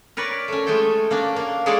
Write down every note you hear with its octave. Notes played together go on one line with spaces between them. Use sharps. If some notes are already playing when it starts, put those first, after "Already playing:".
A#4 B4 C#5 D5
A3 C#4
G#3 A3 C#4 A4 G5
A#3 C#4 D4
A#3
G#3 A#3 G#4 A4 C#5 D5